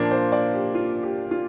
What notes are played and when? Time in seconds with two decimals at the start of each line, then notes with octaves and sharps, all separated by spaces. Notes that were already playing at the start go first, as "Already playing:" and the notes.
Already playing: A#2 F3 A#3 D4
0.11 C5
0.32 D5
0.53 G4
0.75 F4
1.03 G4
1.31 F4